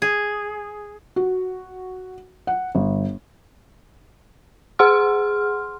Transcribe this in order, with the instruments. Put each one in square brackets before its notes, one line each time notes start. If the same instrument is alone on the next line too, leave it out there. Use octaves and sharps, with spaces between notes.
[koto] G#4
[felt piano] F#4
F#5
G1
[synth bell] G#4 F#5 C6 F6